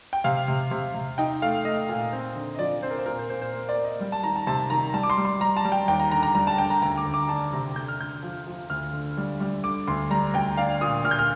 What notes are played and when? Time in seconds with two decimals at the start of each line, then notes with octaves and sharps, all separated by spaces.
0.13 G5
0.24 C3 F5
0.48 C3
0.71 C3
0.94 C3
1.18 D#4 G5
1.42 A3 F5
1.65 A3 D#5
1.89 A#2
2.12 C4
2.36 D3
2.54 D#5
2.59 F3 D5
2.82 C4 C5
2.90 A#4
2.99 C5
3.06 A#2 A#4
3.18 C5
3.30 A#2 C5
3.41 C5
3.53 A#3
3.69 D5
3.77 A#3
3.84 D#5
4.00 G3
4.12 A5
4.23 D#3 A#5
4.36 A5
4.47 C3 A5
4.70 D#3 A#5
4.93 G3 A5
5.03 D6
5.10 C6
5.18 G3
5.25 C6
5.40 G3 A#5
5.57 A5
5.65 G3
5.72 G5
5.88 D#2 G5
6.00 A#5
6.11 D3 A#5
6.23 A#5
6.35 G3 A#5
6.47 A5
6.58 D3 G5
6.70 A#5
6.82 D2 A#5
6.97 D6
7.05 D2
7.14 D6
7.29 D4 A5
7.53 C3 A#5
7.76 D3 G6
7.88 F6
8.00 D3 G6
8.23 F3
8.47 F3
8.70 D2 F6
8.93 D3
9.17 G3
9.40 G3
9.64 D3 D6
9.87 D2 C6
10.10 G3 A#5
10.34 D2 G5
10.57 D4 F5
10.81 A#2 D#6
11.04 A#2 F6
11.11 G6
11.19 F6